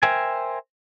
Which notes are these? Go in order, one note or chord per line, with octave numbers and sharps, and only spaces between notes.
A#4 C5 E5 G5 G#5